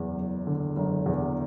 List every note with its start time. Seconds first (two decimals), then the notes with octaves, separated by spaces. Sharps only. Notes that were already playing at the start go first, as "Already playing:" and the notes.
Already playing: F#1 E2
0.17 F#1
0.47 D3
0.76 F#1
1.06 E2